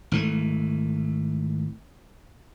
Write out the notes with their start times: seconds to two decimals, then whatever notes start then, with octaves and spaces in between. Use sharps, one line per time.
0.12 G#1 E3 A3